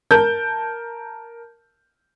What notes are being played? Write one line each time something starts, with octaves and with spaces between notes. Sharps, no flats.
A#4 A5 G6